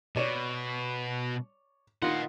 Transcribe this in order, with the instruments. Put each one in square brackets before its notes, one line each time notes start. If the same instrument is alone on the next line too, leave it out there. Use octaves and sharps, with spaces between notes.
[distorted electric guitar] B2 [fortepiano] C#5 D5
[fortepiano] D#3 F4 C6 [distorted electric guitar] D#5 F#5